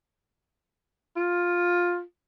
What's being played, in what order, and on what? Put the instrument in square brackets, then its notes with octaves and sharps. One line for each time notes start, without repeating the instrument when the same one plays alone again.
[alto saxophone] F4